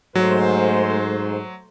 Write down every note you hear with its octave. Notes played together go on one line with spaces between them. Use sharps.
G#2 F#3 A3 C5